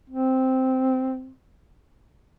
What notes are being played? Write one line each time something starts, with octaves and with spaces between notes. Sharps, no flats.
C4